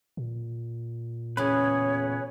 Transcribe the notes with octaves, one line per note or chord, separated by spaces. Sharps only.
A#2
E2 A2 C#3 G#4 B4 C#5